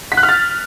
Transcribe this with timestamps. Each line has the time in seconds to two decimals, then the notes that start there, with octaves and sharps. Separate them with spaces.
0.12 B6
0.17 F#6
0.23 F6
0.29 A6